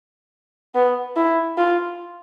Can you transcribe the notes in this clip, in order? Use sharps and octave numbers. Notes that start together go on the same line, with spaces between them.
B3
E4
F4